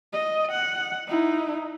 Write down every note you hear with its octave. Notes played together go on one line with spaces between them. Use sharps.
D#5
F#5
D#4 E4